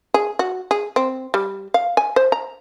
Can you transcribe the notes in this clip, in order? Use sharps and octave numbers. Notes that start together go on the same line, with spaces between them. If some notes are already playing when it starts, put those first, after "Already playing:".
G#4
F#4
G#4
C4
G3
F5
G#5
C5
A#5